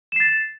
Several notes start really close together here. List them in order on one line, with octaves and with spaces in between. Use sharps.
E7 C7 A6